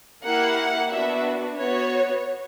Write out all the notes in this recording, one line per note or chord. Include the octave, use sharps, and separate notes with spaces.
A#3 E4 G4 F#5
B3 D4 F#4 E5
B3 F#4 C#5